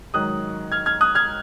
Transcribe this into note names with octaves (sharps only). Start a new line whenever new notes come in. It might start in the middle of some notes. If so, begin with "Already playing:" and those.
G#2 D#3 F#3 D#6 F#6
F6 G#6
F6 G#6
D#6 F#6
F6 G#6